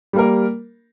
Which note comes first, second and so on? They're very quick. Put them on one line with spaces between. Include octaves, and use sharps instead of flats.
G3 A#3 A#4